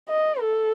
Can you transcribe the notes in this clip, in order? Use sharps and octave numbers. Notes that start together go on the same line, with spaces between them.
D#5
A4